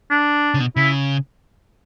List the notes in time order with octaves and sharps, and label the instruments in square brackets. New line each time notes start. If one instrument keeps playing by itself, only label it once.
[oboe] D4
[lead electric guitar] C#3
B2
[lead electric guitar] C#3 [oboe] E4